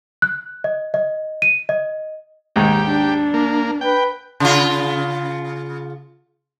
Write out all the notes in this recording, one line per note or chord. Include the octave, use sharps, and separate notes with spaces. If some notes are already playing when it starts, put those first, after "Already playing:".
F#6
D#5
D#5
D#7
D#5
D#2 G#2 G4
D4
A#3
B4 G5
C#3 F4